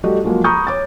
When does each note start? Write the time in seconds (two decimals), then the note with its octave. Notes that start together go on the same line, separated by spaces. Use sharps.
0.04 G3 A3 F#4 G4 D#5
0.24 F3 F#3 G#3 A#3
0.44 A#5 B5 C#6 D#6 G6
0.67 C#5 D6 A6